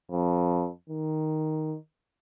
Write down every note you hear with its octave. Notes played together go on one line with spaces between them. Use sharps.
F2
D#3